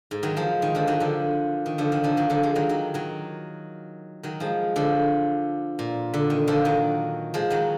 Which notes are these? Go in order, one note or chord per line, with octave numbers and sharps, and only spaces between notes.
G#2
D#3 F#3
F3 G#3
D#3
D3 F3
D#3 F#3
D3 F3
D#3
D3 F3
D#3
D3 F3
D#3 F#3
D3 F3
F3 G#3
D#3 F#3
D#3 F#3
D#3 F#3
D#3 F#3
F3 G#3
D3 F3
A#2
D3
D#3
D3 F3
D#3 F#3
F3 G#3
D#3 F#3